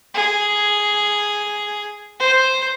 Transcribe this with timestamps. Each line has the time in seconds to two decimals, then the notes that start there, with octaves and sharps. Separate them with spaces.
0.14 G#4
2.19 C5